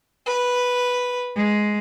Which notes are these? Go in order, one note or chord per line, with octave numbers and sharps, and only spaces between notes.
B4
G#3